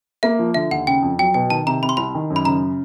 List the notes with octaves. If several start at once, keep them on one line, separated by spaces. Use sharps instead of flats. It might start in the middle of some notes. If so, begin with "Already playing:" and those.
A#3 E5
F3
D3 E5
D#2 F#5
C#3 G5
F2
F#3 G5
B2 G5
D#3 A5
C3 A#5
C3 B5
C6
C2 B5
D#3
F#2
B5
C#3 A#5